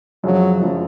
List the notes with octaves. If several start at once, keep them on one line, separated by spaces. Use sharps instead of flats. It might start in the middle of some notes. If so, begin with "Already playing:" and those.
F#2 C#3 F3 F#3
F#2 C#3 F3